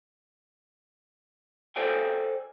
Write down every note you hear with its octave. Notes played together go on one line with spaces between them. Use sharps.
A4 C5 D5 G5 G#5